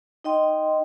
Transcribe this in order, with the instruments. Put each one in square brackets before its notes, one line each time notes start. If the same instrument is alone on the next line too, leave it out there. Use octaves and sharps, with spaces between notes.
[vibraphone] D#4 D#5 G5 C6